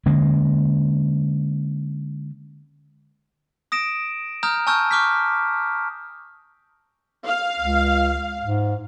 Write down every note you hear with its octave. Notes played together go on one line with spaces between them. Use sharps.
D3 G#3 A#3 C#4
D#6 A#6 D7 E7
A#5 D#6 F6 G6
G#5 A5 C#6 E6 F6 G6
C#6 D6 F6 G6 B6
F5
C#2
G#2